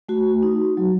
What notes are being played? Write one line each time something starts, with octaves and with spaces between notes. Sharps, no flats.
A3 F#4
D#4
F#3